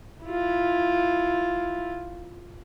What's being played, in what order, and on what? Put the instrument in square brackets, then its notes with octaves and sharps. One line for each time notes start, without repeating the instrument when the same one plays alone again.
[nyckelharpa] E4 F4